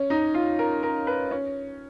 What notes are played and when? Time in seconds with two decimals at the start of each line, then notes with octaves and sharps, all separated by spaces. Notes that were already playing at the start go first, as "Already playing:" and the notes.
Already playing: C#4
0.10 D#4
0.34 F4
0.59 A#4
0.83 A#4
1.07 B4
1.31 C#4